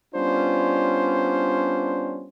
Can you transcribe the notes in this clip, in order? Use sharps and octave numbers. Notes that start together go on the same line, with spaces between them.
G3 B3 C#4 D4 F4 C5